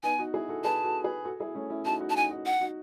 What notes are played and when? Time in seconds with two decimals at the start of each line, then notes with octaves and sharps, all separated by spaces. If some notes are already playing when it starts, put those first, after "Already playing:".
0.03 B3 D#4 G#5
0.19 D#4 F#4
0.34 E4 G#4
0.49 F#4 A4
0.64 G#4 B4 A5
0.84 F#4 A4
1.04 G#4 B4
1.24 F#4 A4
1.40 E4 G#4
1.55 A3 C#4
1.70 C#4 E4
1.85 D#4 F#4 A5
2.01 D#4 F#4
2.10 A5
2.16 D#4 F#4 G#5
2.30 D#4 F#4
2.46 F#5
2.61 D#4 F#4